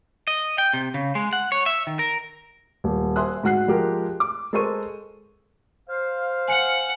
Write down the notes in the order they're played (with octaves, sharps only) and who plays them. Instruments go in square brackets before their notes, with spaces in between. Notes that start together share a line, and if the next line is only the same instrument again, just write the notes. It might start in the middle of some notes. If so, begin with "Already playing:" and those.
[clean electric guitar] D#5
G5
C3
C#3
G#3
F#5
C#5
E5
D#3
A#4
[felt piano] D#1
C5 E5 G#5 C6 D#6 F#6
G#2 F#4 F#5 F#6 C7
F3 G#3 G4 A#4
D6
G#3 A4 A#4 C5 C#6 D#7
[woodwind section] C5 F5
[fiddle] F#5 [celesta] G#5 C#7